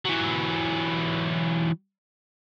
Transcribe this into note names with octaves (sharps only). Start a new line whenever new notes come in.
E3 F#3